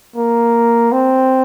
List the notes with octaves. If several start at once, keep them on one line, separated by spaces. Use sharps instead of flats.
A#3
C4